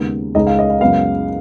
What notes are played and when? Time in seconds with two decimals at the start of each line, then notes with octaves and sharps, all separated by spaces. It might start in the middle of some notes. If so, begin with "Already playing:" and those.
Already playing: D#2 C#3 G#3 B3 D#4
0.35 C#2 C#3 G#3 D#4 D#5
0.47 F5
0.59 D#5
0.70 F5
0.81 F#2 C#3 G#3 B3 F5